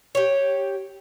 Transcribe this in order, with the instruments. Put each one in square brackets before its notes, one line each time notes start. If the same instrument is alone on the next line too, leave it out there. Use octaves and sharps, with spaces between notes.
[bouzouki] G4 C#5